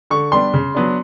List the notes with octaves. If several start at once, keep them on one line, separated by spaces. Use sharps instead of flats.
D3 C#6
G3 B3 D4 C6
C#3
F#3 B3 D4